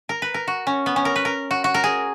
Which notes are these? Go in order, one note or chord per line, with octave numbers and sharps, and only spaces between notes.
A#4
B4
A#4
F#4
C#4
B3
C#4
A#4
B4
A#4
F#4
F#4
A#4
G#4